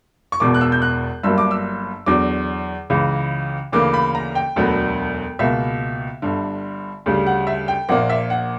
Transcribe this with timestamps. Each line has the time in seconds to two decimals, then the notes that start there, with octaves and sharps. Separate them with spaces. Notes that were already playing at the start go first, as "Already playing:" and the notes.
0.32 C#6
0.40 E1 E2 B2 D6
0.54 F#6
0.61 E6
0.72 G6
0.82 F#6
1.23 G1 G2 F#3 A#3 E6
1.38 D6
1.51 E6
2.06 E2 D3 F#3 D6
2.90 C#2 C#3 E3
3.72 D2 C#3 E3 A#3 D6
3.94 B5
4.15 A#5
4.35 G5
4.56 E1 D2 D3 F#3 B3
5.39 C#2 B2 A#3 E5
6.22 G1 G2 D3
7.06 D2 C#3 G3
7.26 F#5
7.47 E5
7.68 G5
7.89 A#1 A#2 A#3 F#5
8.09 E5
8.30 F#5